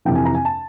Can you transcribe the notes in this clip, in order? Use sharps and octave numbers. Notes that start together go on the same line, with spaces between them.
F2 C3 E3 G5
G#5
A#5
G#5
A5